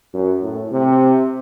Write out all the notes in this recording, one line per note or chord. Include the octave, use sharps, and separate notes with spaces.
F#2
A2
C3